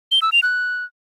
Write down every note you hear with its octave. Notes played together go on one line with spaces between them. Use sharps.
G7
E6
F7
F#6